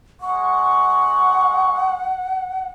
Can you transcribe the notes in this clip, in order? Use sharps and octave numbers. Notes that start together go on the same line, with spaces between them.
G#3 F#5 C#6